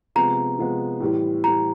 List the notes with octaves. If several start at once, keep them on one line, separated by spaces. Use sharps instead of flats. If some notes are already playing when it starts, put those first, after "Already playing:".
C3 F3 G#3 B3 A#5
C3 F3 G#3 B3
A2 E3 G3
A2 E3 G3 A#5